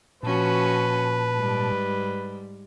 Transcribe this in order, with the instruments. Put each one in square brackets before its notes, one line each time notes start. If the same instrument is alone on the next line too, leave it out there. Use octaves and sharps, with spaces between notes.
[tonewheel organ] A#2 A5 [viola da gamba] F3 C#4 F#4 [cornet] B4
[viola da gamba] G#2 G3